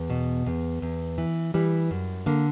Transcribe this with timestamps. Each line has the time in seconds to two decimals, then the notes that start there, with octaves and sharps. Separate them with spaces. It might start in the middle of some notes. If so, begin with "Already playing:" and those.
Already playing: E2
0.10 B2
0.46 E2
0.82 E2
1.18 E3
1.54 E3 G3
1.91 F#2
2.26 D3 A#3